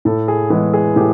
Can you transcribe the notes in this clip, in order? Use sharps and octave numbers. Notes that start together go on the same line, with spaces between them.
A2 A4
G#4
E3 G#3 B3 G#4
G#4
A2 G4